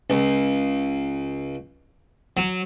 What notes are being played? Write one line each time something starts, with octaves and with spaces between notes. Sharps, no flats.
C#2
F#3